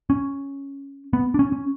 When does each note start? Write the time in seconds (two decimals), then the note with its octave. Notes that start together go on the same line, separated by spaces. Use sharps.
0.10 C#4
1.13 B3
1.34 D4
1.39 C#4
1.52 C#4